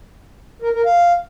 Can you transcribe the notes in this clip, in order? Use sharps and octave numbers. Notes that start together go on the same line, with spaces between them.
A#4
A#4
F5